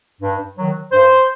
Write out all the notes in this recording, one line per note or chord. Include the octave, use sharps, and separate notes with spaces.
G2
D#3 F#3
G2 C5